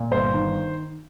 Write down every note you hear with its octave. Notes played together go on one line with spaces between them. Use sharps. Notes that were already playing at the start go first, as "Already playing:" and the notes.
Already playing: A#2
G1 C5
D#3